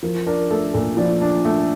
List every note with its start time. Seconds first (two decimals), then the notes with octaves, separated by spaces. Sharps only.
0.03 F3 A#4
0.26 D4 A#4
0.51 A3 A4
0.74 A#2 A4
0.97 F3 D5
1.21 D4
1.45 A3